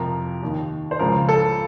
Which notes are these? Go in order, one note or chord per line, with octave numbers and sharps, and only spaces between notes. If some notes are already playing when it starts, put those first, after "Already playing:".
Already playing: F2 C3 F3 A#4
D#2 D#3
C5
C#2 C#3 F3 A#4
A4